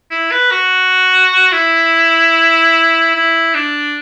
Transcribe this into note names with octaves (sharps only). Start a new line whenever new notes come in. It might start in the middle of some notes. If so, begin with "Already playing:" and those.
E4
B4
F#4
E4
E4
D4